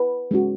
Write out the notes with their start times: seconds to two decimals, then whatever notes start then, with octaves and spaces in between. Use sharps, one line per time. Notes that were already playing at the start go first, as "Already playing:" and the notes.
Already playing: B4
0.31 G#3 C#4 F#4